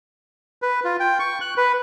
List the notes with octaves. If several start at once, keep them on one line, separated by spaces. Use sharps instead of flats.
B4
F4
G5
C#6
F#6
B4